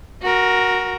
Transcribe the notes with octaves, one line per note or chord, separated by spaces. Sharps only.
F#4 A#4